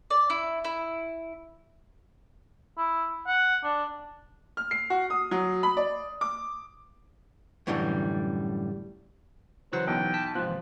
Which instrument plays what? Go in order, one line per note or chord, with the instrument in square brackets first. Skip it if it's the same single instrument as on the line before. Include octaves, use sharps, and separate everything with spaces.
[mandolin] D5
E4
E4
[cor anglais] E4
F#5
D4
[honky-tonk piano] F6
C7
F#4
D#6
F#3
B5
D5
D6
[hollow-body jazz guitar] F#2 A2 D3 E3 G3
[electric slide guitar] C#3 A#4 [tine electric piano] E3 F#3 F#5 [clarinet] C5
[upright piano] B1 [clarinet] G5
[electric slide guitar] A5 [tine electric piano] B6
[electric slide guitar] G#2 C3 [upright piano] F3 F#6 [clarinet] F4
[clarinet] E3